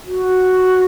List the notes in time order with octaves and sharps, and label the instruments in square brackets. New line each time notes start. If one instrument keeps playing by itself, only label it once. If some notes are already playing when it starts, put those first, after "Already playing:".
[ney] F#4